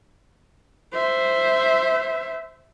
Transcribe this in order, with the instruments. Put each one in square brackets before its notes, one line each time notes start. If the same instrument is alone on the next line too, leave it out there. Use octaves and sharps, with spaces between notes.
[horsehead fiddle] C5 E5